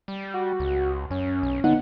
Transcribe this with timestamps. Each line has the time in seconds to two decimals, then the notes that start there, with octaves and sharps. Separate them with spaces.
0.08 G3
0.34 F#4
0.60 C#2
1.11 F#2 C#4
1.43 B1
1.64 D3 B3 D#4 F#5